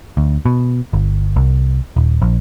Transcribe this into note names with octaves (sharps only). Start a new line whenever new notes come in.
D2
B2
G1
C2
D#1
A#1